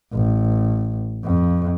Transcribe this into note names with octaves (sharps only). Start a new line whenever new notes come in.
A1
F2